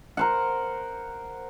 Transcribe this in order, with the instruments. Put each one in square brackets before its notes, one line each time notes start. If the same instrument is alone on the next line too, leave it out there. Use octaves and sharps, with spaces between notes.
[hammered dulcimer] A#4 C5 F#5